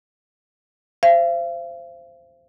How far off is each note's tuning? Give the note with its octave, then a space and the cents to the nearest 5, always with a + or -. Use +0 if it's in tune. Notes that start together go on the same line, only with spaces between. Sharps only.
C5 +0 F5 -45